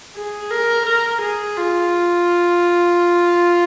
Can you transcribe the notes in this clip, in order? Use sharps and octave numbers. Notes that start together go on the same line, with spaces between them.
G#4
A#4
A#4
G#4
F4